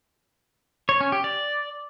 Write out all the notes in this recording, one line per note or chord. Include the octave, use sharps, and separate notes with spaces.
C#5
C#4
G4
D5